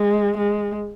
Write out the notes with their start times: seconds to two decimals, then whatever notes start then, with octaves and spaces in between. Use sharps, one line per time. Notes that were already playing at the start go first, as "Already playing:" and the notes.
Already playing: G#3
0.38 G#3